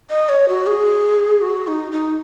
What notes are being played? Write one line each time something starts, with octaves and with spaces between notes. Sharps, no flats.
D#5
C#5
F#4
G#4
F#4
D#4
D#4